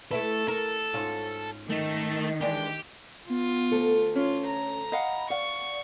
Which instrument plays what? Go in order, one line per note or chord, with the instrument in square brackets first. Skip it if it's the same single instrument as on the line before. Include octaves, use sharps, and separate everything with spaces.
[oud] A3 E4 B4 [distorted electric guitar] A4
[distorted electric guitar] A4 [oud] A#4
[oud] G#2 C#4 F4
[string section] D#3 [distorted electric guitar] A3
[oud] E3 G#3 D4 [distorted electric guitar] G4
[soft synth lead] B3 [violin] F4
[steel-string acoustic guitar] D2 A4
[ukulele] C#4 [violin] F4 [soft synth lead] C#5
[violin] A#5
[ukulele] D#5 F5 F#5 [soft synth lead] B5
[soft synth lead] D5 [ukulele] F5 [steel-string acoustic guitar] F#5 [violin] C#6